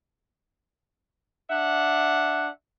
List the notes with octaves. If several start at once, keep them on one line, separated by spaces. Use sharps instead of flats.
D4 E5 F#5